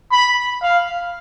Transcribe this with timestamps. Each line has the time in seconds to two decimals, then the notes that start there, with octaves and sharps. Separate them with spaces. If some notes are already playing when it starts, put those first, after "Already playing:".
0.12 B5
0.63 F5